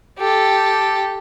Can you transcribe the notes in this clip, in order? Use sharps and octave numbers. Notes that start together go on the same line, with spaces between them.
G4 A4